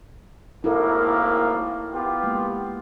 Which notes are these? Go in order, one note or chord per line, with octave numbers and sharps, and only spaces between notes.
G#1 A2 A#3 E4 A4 A#4
B3 F4 G4
G#3 A#3